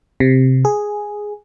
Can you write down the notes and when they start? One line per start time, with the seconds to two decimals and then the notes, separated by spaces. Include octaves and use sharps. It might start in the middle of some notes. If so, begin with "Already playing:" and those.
0.20 C3
0.65 G#4